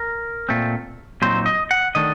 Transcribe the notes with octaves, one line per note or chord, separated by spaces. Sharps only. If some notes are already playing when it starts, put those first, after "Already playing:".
Already playing: A#4
A#2 A3 C4
A#2 F#3 C4 D#4 C5
D#5
F#5
D#3 A3 D4 D#5